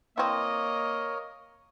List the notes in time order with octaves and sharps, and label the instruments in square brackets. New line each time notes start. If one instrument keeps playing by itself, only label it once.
[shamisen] E3 C4 [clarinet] A#3 [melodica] A#4 C#5 [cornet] D#5